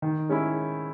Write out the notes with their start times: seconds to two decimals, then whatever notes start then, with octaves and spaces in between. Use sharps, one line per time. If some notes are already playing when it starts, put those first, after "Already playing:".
0.02 D#3
0.29 G#3 C#4 E4